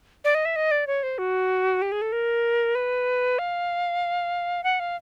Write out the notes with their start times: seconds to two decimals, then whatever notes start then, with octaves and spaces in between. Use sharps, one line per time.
0.24 D5
0.35 D#5
0.45 E5
0.56 D#5
0.71 D5
0.87 C#5
1.03 C5
1.18 F#4
1.82 G4
1.92 G#4
2.02 A4
2.12 A#4
2.75 B4
3.39 F5
4.64 F#5
4.80 F5